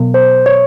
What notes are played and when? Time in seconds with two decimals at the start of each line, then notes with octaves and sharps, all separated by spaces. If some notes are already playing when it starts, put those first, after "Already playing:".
Already playing: B2 F#3 B3
0.14 C5
0.46 C#5